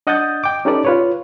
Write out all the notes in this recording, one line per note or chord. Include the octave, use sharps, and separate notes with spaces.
D4 D#5 F#5 D#6 G6 A6
G5 D6
C#4 D#4 G4 A4 B4 D5
F4 B4 C#5